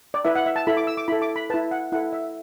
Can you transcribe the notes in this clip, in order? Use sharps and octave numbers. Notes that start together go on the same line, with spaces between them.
D5
E4 B4 E5
F#5
E5
A5
E4 A4 B5
D6
E6
D6
E4 A4 B5
D6
B5
E4 B4 A5
F#5
E4 A4 F#5
E5